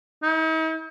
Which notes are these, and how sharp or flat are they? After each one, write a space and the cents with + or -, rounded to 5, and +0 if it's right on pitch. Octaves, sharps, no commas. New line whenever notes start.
D#4 +45